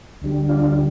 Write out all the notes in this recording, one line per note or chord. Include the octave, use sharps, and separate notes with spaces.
D2 D3 G3
D4 F4